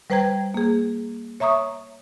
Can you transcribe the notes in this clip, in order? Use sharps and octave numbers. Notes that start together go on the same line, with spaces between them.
G3 B4 C5 G5 A#5 G#6
A#3 G#4
C#5 E5 A#5 C#6 D#6